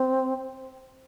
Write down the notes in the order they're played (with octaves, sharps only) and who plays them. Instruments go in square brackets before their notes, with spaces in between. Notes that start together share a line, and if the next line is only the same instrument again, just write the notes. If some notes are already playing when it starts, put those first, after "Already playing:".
Already playing: [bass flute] C4